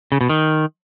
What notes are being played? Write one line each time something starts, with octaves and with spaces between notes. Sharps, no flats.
C#3
B2
D#3